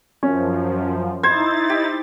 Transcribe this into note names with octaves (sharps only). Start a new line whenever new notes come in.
F#2 F3 C#4
D#4 E4 C5 G#6 A6
G4